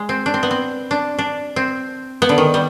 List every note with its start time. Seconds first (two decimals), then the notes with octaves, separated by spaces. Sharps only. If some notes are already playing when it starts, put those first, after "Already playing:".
Already playing: G#3
0.09 C4
0.26 D4
0.34 C4
0.43 B3
0.51 C4
0.91 D4
1.19 D4
1.56 C4
2.22 B3
2.29 D3
2.38 D#3
2.54 G3